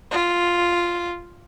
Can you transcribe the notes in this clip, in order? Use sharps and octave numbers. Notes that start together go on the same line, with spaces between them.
F4